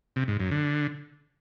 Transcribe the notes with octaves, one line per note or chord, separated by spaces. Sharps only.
C3
G#2
F#2
D3